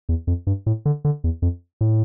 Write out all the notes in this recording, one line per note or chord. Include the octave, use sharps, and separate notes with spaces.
E2
F2
G2
A2
D3
D3
E2
F2
A2